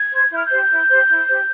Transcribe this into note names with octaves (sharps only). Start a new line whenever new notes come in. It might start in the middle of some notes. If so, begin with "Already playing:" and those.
Already playing: G#6
C5
E4 G6
F6
G6
G4 C5
E4
G4 C5
E4
G4 C5